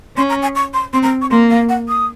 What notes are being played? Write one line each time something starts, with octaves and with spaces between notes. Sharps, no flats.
C#4 C6
A#5
G#5
C#6
C6
C4 C6
A#5
C#6
A#3 C6
F5
F#5
D#6